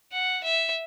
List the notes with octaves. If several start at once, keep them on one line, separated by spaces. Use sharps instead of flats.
F#5
E5